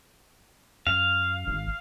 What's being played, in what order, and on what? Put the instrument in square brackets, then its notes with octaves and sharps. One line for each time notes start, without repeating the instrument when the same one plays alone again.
[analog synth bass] F#2 [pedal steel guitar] F5
[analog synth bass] G#1